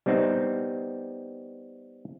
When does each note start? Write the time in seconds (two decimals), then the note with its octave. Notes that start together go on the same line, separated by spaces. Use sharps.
0.06 G3 B3 C4 D#4